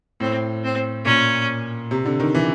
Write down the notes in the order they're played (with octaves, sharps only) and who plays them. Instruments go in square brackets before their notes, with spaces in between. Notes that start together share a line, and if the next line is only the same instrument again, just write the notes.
[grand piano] A2 [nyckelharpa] C4
[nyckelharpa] C4
[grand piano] A#2 [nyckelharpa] C#4
[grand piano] C3
D3
D#3
E3